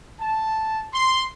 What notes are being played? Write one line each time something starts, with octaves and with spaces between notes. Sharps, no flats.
A5
C6